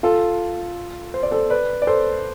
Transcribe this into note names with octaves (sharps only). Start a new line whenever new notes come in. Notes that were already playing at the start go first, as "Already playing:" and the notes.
F4 A4
C5
D5
A4 C5
B4 D5
D5
A4 C5